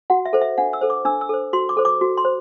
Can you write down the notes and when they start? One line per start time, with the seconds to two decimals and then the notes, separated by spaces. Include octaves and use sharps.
0.10 F#4 F#5
0.25 E5
0.33 A4 C5
0.41 E5
0.58 D4 F#5
0.73 E6
0.81 A4 C5
0.90 D6
1.05 D4 E6
1.21 E6
1.29 A4 C5
1.53 F#4 C6
1.69 D6
1.77 A4 C5
1.85 D6
2.01 F#4
2.17 C6
2.25 C5